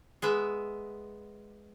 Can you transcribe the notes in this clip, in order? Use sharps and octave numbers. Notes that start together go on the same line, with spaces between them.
G#3 B3 E5